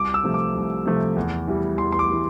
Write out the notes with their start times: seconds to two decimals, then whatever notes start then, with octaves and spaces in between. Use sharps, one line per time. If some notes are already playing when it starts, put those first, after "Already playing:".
Already playing: C2 D6
0.14 E6
0.24 C3 F3 A3
0.34 D6
0.55 C2
0.85 C3 F3 A3
1.16 E2
1.47 E3 G3
1.78 E2 C6
1.92 C6
1.99 D6
2.09 E3 G3